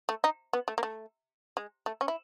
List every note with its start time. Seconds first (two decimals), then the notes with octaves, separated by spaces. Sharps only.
0.09 A3
0.24 D#4
0.53 B3
0.68 A3
0.78 A#3
0.83 A3
1.57 G#3
1.86 A3
2.01 C#4
2.08 E4